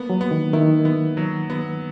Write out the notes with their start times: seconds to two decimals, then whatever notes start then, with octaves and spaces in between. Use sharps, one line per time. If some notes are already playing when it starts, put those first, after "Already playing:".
Already playing: A#3 B3
0.10 F#3
0.21 B3
0.31 D#3
0.53 D#3 E4
0.85 B3
1.17 F#3
1.50 B3